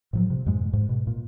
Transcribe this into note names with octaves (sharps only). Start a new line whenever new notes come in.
A2 F3 F#3
C3
F2 G#2 B2 G#3
G#2
B2
A#2